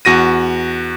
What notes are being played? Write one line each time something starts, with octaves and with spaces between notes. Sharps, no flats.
E2 F#4 A#6 D#7